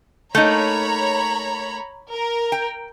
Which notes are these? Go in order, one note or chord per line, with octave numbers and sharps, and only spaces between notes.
A3 A#3 D#4 C#5 A#5 B5
A#4
G5